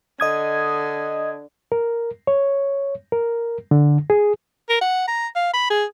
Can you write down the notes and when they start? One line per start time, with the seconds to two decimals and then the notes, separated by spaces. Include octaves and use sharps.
0.20 D3 D#5 D#6 G#6
1.72 A#4
2.27 C#5
3.12 A#4
3.71 D3
4.10 G#4
4.69 A#4
4.81 F#5
5.08 A#5
5.36 F5
5.53 B5
5.70 G#4